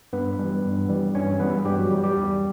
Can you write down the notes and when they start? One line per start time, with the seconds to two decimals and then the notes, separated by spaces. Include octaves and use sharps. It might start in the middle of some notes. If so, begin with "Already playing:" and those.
0.13 G2 B3 B4
0.39 E3 G3
0.64 G2
0.89 E3 G3
1.15 G2 C#4 C#5
1.40 E3 G3 B3 B4
1.65 G2 G3 G4
1.78 F#3 F#4
1.91 E3 G3 G4
2.03 G3 G4
2.16 E2